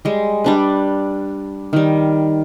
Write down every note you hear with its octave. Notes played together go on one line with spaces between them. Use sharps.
G3 G#3
G3 D4 B4
D#3 G3